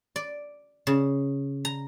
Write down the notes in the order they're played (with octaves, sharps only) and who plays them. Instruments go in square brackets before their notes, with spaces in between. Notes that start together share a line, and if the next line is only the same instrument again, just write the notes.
[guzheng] D5
C#3
A#5